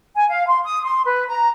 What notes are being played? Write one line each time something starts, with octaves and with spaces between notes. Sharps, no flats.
G#5
F5
C6
D#6
C6
B4
A#5